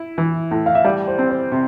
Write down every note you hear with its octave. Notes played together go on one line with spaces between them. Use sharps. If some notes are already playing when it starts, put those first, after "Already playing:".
Already playing: E4
E3
A2
F5
E5
G3 D5
C5
C4
C5
C3